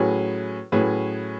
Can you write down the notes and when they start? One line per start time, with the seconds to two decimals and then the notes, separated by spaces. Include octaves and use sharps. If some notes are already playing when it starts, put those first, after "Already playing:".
Already playing: A2 F#3 C#4 G#4 B4
0.72 A2 F#3 C#4 G#4 B4